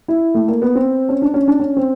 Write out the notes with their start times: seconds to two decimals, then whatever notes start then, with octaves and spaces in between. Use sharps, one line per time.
0.08 E4
0.35 A3
0.48 A#3
0.62 B3
0.75 C4
1.09 C#4
1.22 D4
1.34 C#4
1.48 D4
1.60 C#4
1.77 C4